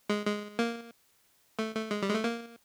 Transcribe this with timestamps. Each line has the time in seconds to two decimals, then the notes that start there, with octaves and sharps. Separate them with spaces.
0.09 G#3
0.26 G#3
0.59 A#3
1.59 A3
1.75 A3
1.91 G#3
2.02 G3
2.09 G#3
2.14 A3
2.24 A#3